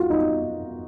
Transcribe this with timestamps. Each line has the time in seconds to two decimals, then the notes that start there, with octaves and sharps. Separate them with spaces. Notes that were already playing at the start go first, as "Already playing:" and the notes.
Already playing: F4 F#4
0.10 D#4